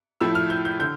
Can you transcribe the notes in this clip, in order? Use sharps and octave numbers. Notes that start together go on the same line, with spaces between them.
A2 F3 A3 E4 E6
F6
G6
G6
D3 G6